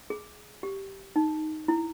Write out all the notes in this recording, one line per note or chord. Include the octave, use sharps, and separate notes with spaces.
G#4
G4
D#4
E4